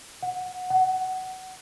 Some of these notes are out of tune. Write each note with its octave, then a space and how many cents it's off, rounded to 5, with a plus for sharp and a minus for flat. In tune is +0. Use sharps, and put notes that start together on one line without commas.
F#5 -15
F#5 +15